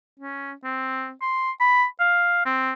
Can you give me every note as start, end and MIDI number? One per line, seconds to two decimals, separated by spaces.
0.20 0.52 61
0.64 1.12 60
1.22 1.51 84
1.60 1.85 83
2.00 2.44 77
2.46 2.73 60